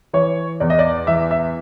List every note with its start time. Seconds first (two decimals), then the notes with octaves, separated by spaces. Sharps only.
0.13 E3 C#5
0.60 E2 D5
0.70 D#5
0.79 D5
1.07 E3 E5
1.31 E5